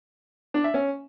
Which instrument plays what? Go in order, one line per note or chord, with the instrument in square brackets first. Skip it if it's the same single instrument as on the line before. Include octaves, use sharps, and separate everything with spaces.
[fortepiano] D4
E5
C#4